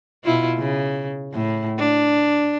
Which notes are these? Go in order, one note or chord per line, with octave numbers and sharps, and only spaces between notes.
B2 E4 F4
C#3
A2
D4